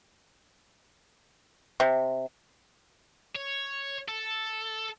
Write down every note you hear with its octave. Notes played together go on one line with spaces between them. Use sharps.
C3
C#5
A4